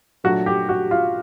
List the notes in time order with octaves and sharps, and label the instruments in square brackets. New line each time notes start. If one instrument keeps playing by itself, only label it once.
[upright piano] A#2 F#3 A3 D4 F#4
G4
F#4
F4